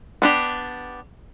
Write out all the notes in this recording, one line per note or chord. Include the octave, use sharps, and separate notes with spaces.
B3 D4 G4